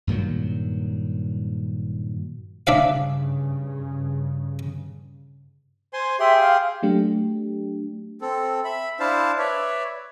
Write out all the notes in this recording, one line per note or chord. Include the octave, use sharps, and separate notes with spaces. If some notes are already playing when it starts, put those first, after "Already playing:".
G2 A#2 D#3 F#3
G2 C#3 D4 E5 F5
C5 G#5 C6
G4 G#4 E5 C6
F5
F#3 A3 D4 G4
C4 A4
E5 B5
D4 E4 C5 F5 A5
B4 C#5 D5 E5